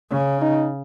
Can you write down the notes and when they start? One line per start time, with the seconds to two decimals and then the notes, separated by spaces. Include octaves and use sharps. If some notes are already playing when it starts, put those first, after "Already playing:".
0.11 C#3 C#4
0.41 D#4